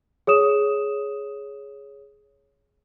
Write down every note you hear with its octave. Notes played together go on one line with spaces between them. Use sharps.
G#4 C#5 D#6 E7